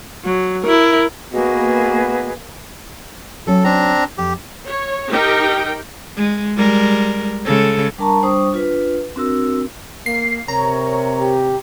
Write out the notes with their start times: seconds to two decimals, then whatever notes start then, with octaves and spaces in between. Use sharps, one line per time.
0.25 F#3
0.63 E4 A#4
1.32 A#3 B3 F#4 G#4 B4 D#5
3.47 F#3 C#4 A4
3.64 C4 D4 A#5
4.18 F2 G4
4.65 C#5
5.10 D#4 G4 A#4 G5
6.16 G#3
6.57 G3 G#3 A#4
7.45 C#3 G#3 A4
7.98 G3 D4 A#4 A5 A#5 C#6
8.22 G3 D4 C5 C#6 D#6
8.52 D4 F4 B4
9.16 C4 D4 F#4 A#4 E6
10.06 A#3 C7
10.48 C3 A#4 C#5 A#5
11.21 G4